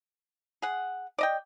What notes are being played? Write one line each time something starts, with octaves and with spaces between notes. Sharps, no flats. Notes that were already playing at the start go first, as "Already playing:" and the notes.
G#4 F#5
D5 D#5 G5